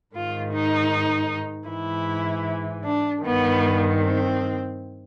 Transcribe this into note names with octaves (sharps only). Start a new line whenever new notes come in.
G#2 D#3 F4
D#4
G#2 E3 E4
D4
G2 D#3 B3
C4